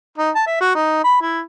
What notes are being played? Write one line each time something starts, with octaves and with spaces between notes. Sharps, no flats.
D#4
A5
E5
F#4
D#4
B5
E4